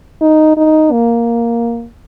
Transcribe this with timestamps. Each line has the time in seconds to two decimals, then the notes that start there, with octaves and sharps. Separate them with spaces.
0.21 D#4
0.57 D#4
0.92 A#3